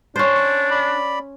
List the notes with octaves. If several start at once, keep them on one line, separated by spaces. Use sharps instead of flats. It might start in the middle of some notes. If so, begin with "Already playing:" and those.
C#4 D4 C5
C#5
D5 B5